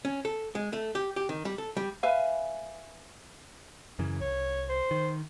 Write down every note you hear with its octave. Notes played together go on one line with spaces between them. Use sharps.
C#4
A4
G#3
A3
G4
G4
D#3
G3
A4
G3
B4 E5 F5 G#5
F#2 C#3 E3
C2 C#5
C5
D#3